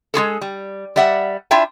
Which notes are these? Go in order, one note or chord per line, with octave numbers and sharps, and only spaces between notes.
G#3 F4 G#4 A4
G3
G3 D5 E5 F#5
D4 E4 F4 E5 G5